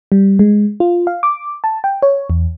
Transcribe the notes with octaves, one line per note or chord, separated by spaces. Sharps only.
G3
G#3
F4
F5
D6
A5
G5
C#5
E2